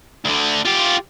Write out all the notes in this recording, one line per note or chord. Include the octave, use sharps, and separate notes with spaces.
D2 D3
F4 G4